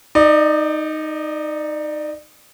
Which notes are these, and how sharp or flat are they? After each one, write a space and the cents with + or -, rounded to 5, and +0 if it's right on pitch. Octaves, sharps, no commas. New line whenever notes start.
D#4 +0 D5 +30